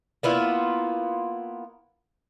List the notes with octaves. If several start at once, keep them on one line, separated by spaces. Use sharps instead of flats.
A#3 B3 E4 F4